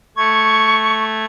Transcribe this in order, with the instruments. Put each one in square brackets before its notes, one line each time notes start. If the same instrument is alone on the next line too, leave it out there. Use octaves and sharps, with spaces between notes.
[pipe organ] A3 G#6 [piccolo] C#6